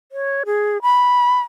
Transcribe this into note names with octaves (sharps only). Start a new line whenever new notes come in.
C#5
G#4
B5